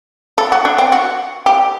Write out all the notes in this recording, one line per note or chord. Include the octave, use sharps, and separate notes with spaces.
A4
F#4
D4
C4
F#4
G4